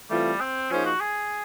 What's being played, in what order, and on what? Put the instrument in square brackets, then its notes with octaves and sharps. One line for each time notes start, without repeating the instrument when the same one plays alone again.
[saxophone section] E3 A3 C4 F4 A4 [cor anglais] G3
[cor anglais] C4
[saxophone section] F3 A#3 D#4 G#4 C5 [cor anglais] C#4
[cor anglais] F#4
G#4